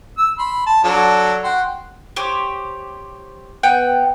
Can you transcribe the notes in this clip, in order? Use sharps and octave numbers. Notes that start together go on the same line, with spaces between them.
E6
B5 C6
A5
F#3 D4 A4
F#4 G5 C6
G4 C5 C#5
B3 F#5 G5